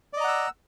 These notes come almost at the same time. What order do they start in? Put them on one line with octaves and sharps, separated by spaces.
D5 D#5 A#5 F#5 E6